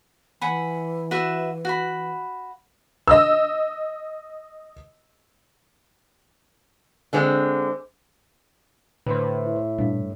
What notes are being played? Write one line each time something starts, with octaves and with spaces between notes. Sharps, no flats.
E3 F#5 G#5 B5
F#4 B4 E5
F#4 B5
D#5 E6
D3 G#3 C4
A2 D3 B4 C5
E4
G2 A#2 D4